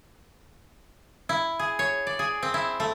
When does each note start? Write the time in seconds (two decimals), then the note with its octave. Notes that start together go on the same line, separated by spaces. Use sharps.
1.29 E4
1.59 G#4
1.79 C#5
2.07 D5
2.19 G#4
2.43 C4
2.54 E4
2.80 A3